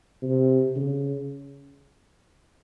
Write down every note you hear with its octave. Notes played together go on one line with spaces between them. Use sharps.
C3
C#3